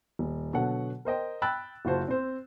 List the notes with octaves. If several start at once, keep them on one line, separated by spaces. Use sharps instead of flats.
D#1
B2 D3 F#3 A4 F#5
A#4 C5 D#5 G5
G5 B5 E6 F#6 A6
F#1 F4 F#4 C5 A5
C4 C5